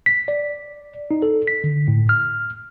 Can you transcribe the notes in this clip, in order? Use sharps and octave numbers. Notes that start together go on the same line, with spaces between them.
B6
D5
D#4
A4
B6
D3
A2
F6